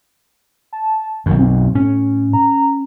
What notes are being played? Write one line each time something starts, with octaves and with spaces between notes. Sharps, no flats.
A5
B1 F#2 D#3
C4
A2 C#4
A#5